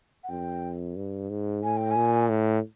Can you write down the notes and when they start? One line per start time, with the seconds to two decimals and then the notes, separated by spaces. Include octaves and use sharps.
0.24 F#5
0.29 F2 G5
0.96 G2
1.30 G#2
1.63 A2 G#5
1.77 G5
1.91 G#5
1.96 A#2
2.29 A2